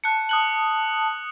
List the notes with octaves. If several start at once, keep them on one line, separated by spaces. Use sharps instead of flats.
A5 F#6 C#7
D#6 F#6 F#7